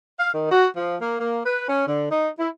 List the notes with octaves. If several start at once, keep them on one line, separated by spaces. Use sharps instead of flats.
F5
D#3
F#4
F3
A#3
A#3
B4
C#4
D3
D#4
E4